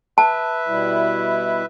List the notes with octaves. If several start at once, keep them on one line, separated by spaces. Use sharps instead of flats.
B4 E5 A5
B2 G3 E4